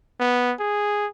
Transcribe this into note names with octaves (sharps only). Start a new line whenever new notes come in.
B3
G#4